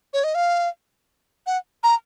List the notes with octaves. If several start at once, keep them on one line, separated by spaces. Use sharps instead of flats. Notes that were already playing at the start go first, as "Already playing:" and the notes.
C#5
D#5
F5
F#5
A#5